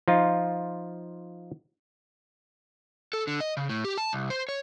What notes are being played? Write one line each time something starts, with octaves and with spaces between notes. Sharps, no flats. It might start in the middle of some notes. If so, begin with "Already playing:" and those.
F3 D#4 F4
A4
D3
D#5
C#3
A2
G4
A5
C2
C5
C#5